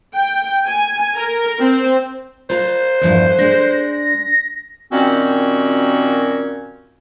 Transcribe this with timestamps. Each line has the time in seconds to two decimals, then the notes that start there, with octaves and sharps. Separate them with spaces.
0.14 G5
0.67 G#5
1.16 A#4
1.60 C4
2.50 F4 C5 A#5
3.01 E2 G2 F3
3.39 G#3 D4 A#6
4.92 A#2 D#3 C4 C#4 F#4